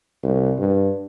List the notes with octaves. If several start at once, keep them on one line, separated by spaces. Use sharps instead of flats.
C2
G2